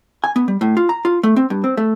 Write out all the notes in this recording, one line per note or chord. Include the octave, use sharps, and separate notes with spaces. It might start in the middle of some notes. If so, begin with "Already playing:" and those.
G#5
B3
G3
A2
F4
A#5
F4
A3
C4
G2
C4
A3